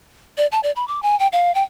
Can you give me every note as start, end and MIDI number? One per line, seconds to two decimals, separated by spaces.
0.38 0.47 74
0.52 0.60 81
0.63 0.71 74
0.76 0.87 83
0.88 1.02 86
1.02 1.18 80
1.19 1.27 79
1.33 1.54 77
1.55 1.63 79